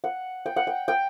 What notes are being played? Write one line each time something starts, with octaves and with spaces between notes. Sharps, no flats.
F#5
G5
F#5
G5
G5